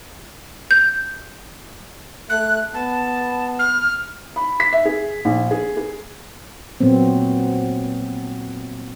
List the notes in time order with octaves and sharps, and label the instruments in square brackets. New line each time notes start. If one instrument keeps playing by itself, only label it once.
[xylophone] G6
[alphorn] A3 [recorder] F#6
[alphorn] B3 [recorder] A5
[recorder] F6
[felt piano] B5
B6
E5
G#4
A#1
G#4
G#4
[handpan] A#2 F#3 B3 C4